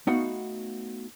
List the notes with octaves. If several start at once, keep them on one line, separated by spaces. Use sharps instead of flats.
A3 B3 D#4 F#4 F5 F#5